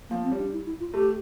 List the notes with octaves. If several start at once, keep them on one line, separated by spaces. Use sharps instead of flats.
F3 A#3
C4
G3
D4
E4
E4
F4
A3 G4